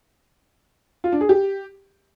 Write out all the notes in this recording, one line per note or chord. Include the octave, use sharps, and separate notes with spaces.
F4
D4
G#4
G4